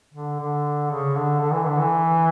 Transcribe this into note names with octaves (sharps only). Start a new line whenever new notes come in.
D3
D3
C#3
D3
D3
E3
D3
E3